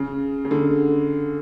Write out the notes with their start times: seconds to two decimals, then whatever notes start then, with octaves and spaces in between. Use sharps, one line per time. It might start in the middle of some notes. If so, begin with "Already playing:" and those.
Already playing: C#3
0.45 C#3
0.51 D3